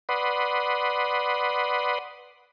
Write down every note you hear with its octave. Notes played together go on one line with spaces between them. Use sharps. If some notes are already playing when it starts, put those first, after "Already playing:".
B4 D5 F#5 B5 C6 D#6